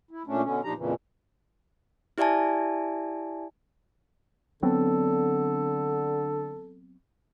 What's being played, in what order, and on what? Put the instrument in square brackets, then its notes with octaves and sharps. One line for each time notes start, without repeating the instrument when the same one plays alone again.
[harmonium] E4
A#2 A3 C#4 D4
B2 D3 C#4
A#2 F3 D4 D#4 G4 A#5
F2 A#2 C#3 E3
[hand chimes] E4 G4 D5 E5 G#5 A5
[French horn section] D3 [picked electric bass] F#3 B3 C4 [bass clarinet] A4